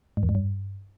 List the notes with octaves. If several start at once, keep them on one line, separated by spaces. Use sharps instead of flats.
G#2
E2
G#2
G2